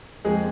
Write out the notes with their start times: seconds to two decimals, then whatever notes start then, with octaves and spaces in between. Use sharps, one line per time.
0.25 F2 F3 G#3 A#3 G#4